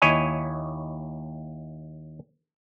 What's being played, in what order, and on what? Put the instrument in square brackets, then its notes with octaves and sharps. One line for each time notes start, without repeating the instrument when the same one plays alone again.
[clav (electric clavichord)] D#2 E4 C#5 D#5 G#5